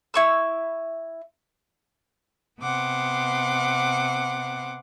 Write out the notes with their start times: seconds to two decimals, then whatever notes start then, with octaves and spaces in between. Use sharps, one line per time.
0.14 E4 C#6 E6
2.61 C3 B3 F#5 C6 D6